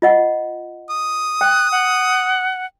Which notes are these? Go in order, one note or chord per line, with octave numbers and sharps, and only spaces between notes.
F4 D#5 F#5
D#6
G5 F#6
F#5